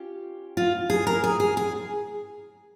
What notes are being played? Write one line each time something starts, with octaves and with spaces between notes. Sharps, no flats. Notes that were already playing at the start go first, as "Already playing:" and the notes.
Already playing: C#4 F4 G4
F4
G#4
A#4
G#4
G#4
G#4